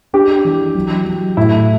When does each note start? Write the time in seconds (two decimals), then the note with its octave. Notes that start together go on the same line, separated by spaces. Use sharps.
0.13 D4 G4
0.45 E3
0.75 F#3
1.06 F#3
1.37 A2 E4